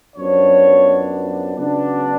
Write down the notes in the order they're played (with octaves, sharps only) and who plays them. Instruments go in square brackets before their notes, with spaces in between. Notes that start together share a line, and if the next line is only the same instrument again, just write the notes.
[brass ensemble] F#2 F3 B3 D4 C#5
C#3 F#3 B3 D4